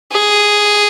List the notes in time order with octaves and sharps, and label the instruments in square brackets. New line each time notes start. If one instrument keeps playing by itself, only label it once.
[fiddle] G#4